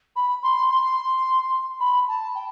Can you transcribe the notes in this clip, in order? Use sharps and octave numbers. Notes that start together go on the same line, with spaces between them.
B5
C6
C6
B5
A5
G5